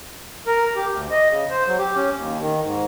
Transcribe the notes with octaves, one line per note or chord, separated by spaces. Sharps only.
A#4
G4
D2
D#5
C#3
C5
F#3
G4
C#4
D#2
D#3
G#2